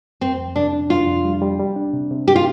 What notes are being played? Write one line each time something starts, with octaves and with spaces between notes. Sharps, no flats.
F2 C4
F2
C3 D4
D4
D4 F4
F2
G3
G3
G3
D4
C3
C3
G4
F4